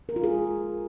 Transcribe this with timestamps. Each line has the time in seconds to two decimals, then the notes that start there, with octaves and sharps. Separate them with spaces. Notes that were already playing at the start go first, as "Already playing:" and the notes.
0.09 A#4
0.16 F4
0.23 G#4